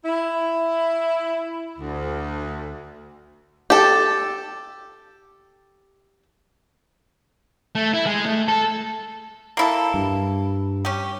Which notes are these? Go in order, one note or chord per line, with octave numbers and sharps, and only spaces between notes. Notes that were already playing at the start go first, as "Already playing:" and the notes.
E4
D2
G4 A4
A3
E4
G#3
A3
A4
A#3 E4 A4
G2
C#4 G4